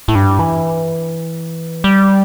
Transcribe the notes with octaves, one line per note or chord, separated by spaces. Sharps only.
A2
G2
E3
G3